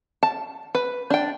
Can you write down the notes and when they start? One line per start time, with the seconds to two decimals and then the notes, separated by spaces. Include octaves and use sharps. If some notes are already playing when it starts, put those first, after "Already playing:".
0.23 A5
0.75 B4
1.10 D4 G5